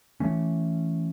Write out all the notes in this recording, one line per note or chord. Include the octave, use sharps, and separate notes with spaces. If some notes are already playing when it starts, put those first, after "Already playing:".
E3 A3 C#4